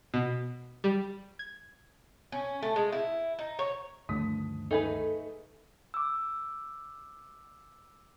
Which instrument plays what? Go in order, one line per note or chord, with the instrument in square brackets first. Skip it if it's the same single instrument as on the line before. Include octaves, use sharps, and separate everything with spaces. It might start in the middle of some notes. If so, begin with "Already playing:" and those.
[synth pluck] B2
G3
G#6
[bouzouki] C#4
A3
G#3
E4
D#4
C#5
[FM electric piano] D2 [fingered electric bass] G2 D#3 F3 [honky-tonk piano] D#6 B6
[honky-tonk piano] A3 [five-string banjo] D#4 G#4 B4
[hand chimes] D6 E6